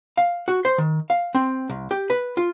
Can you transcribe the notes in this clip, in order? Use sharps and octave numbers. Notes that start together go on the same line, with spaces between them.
F5
F#4
C5
D#3
F5
C4
C2
G4
B4
F4